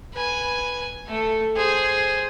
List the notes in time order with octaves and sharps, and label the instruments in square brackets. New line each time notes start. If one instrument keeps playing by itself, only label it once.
[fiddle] B4 G#5
A3 A4
G#4 C5